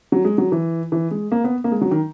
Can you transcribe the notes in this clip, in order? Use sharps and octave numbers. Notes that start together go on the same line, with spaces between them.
F#3
G#3
F#3
E3
E3
G#3
A#3
B3
A#3
G#3
F#3
D#3